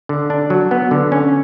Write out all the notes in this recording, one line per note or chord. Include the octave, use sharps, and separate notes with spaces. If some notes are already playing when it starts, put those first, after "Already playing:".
D3
D4
F#3
B3
D3
C#4